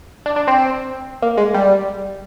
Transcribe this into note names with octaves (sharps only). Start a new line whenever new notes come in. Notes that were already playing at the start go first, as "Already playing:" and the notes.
D4
D4
C4
A#3
G#3
G3